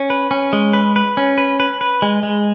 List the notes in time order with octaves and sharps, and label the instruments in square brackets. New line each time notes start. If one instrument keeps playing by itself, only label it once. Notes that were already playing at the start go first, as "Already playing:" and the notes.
Already playing: [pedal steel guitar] C#4
B4
C#4
G#3
B4
B4
C#4
B4
B4
B4
G#3
G#3